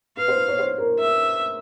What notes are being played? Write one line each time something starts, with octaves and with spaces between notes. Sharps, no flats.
B4 F5
C5
B4
C#5
C5
A#4
E5